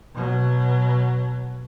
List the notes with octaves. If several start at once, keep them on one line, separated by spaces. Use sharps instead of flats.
B2 F#3